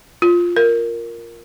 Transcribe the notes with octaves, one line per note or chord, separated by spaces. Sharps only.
F4
A#4